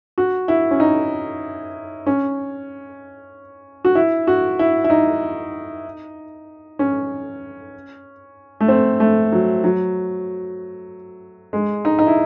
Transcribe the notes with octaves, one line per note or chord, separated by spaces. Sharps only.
F#4
E4
C#4
D#4
C#4
F#4
E4
F#4
E4
E4
D#4
C#4
A3
C4
A3
F#3
F#3
G#3
D#4
D#4
E4